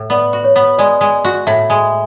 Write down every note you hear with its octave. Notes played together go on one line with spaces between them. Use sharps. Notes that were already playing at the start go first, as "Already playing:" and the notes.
Already playing: A2
B3 D5
F#4
C#5
B3
G#3 D5
G#3
F#4
A2 E5
G#3